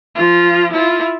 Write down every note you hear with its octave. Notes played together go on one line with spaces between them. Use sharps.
F3 F4
E4 F4